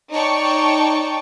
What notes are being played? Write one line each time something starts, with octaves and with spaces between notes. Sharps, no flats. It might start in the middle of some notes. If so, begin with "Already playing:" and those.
D#4 C#5 D5 G5 A5 C#6